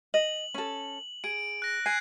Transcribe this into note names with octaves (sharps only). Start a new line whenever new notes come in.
D#5 F#7
C#4 A4
G#4 D7
F#6 A#6
G#5 F#6 G#6 C7